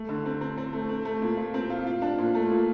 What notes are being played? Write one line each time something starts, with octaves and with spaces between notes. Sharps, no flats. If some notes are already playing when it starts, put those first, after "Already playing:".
Already playing: A3
D3
C4
C4
C4
A3
C4
A3
A#2
A#2
C4
F4
F4
D4
A#2
A3
A#2